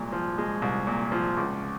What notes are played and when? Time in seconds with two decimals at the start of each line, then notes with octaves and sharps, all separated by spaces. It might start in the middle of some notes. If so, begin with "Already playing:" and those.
Already playing: C2 A#2 G#3
0.12 F3
0.38 G#3
0.62 C2
0.87 A#2
1.12 F3
1.37 C#2